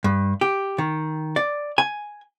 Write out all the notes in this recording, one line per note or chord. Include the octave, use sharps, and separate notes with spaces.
G2
G4
D#3
D5
G#5